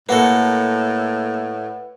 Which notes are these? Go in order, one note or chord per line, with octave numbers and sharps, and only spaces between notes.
A2 A#3 F#4 A4 B4 F#5